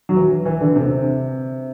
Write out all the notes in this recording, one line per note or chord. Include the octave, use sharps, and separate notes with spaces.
F#3
E3
E3
D3
C3